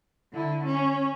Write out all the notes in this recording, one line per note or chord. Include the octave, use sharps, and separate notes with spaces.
D3 E4
C#4